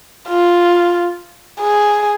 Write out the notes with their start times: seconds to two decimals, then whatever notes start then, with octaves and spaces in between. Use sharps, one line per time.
0.28 F4
1.61 G#4